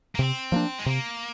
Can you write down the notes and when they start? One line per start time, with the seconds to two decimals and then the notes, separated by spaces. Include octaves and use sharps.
0.15 A#3
0.19 C3 C4
0.52 F3 A#3 D4
0.79 G#3
0.86 C3 A#3